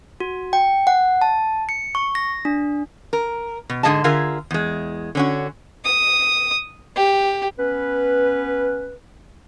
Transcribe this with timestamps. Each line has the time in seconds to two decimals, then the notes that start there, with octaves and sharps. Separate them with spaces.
0.20 F#4
0.53 G5
0.87 F#5
1.21 A5
1.69 C#7
1.95 C#6
2.15 A#6
2.45 D4
3.13 A#4
3.70 B2
3.83 G#2 D3 F3 G#4 D#5 A5
4.04 D3 F4 G#4 A#4 E5
4.51 E2 G#3
5.15 D3 C#4 F#4
5.84 D#6
6.96 G4
7.58 B3 C#4 B4